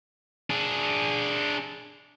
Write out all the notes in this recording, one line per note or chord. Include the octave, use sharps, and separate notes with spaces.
D4 G#4